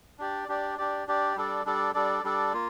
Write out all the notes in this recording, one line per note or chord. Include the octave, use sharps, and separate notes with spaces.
D4 G4 D5
D4 G4 D5
D4 G4 D5
D4 G4 D5
G3 D4 A4 D5
G3 D4 A4 D5
G3 D4 A4 D5
G3 D4 A4 D5
A#3 F4